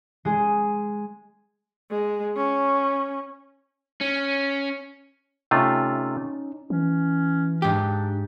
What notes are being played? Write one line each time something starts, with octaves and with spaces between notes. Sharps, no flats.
G#3 G#4
G#3
C#4
C#4
C3 A3 C#4 D#4 F4
E3 C#4
G#2 D4 G4